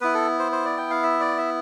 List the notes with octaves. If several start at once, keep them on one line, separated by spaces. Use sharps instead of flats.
B3 E4 B4
A4
C5
C5
D5
G5
F5
E5
D5
E5